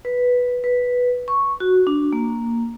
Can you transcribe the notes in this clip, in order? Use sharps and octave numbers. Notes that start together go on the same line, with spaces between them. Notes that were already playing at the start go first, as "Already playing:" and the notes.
B4
B4
C#6
F#4
D4
A#3